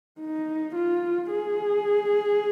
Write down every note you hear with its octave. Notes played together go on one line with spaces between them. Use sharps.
D#4
F4
G#4